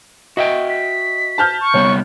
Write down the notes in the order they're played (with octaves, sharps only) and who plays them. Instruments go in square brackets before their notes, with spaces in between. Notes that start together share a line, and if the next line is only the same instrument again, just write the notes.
[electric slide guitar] F#4 E5 G5 [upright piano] D#5
[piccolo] B6
[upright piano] A5 F6 G6
[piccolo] C#6
[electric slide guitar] C3 G3 B3 [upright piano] C#5